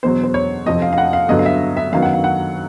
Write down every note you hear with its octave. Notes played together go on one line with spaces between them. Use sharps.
E2 B2 F#3 C5
C5
C#5
F2 C3 F3 D#5
F5
F5
F#5
F5
G2 D3 F#3 B3 D#5
F5
E5
E5
F#2 D#3 F#3 B3 F5
F#5
F5
F#5